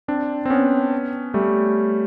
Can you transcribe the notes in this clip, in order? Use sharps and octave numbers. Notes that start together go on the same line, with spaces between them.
C4 D4
C4
B3 C#4
G3 A3